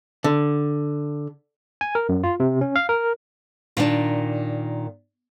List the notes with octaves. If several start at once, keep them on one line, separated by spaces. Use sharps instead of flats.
D3
G#5
A#4
F#2
F4
C3
C#4
F5
A#4
A#2 D#3 D4